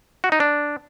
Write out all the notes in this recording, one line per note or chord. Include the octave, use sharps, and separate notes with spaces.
F#4
D#4
D4